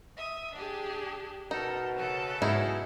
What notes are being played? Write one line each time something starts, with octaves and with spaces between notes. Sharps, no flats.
E5 D#6
D4 G4 G#4
B2 D#4 A4 A#4
C#3 A4 F#6
G#2 B2 F#3 C#4 D#4 E4 G#4